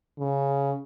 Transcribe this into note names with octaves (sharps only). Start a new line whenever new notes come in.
C#3